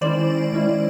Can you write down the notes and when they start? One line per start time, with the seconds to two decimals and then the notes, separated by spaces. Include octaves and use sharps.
0.01 D#3 G#3 C#4 E4 C5 D5
0.52 D#3 G#3 C#4 E4